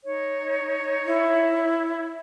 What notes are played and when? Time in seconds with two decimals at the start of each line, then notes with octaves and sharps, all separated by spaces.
0.05 D#4 C#5
1.06 E4